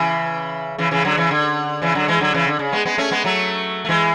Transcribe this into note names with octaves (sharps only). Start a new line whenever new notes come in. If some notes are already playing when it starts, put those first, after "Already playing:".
Already playing: C#3 E3
C#3 E3
C#3 E3
D3 F#3
C#3 E3
D3
C#3 E3
D3 F#3
E3 G#3
D3 F#3
C#3 E3
D3
C#3
G#3 B3
G#3 B3
A3 C#4
G#3 B3
F#3 A3
A3
E3 G#3